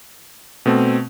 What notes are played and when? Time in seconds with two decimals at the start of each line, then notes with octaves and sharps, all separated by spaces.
0.66 B2 A3 C4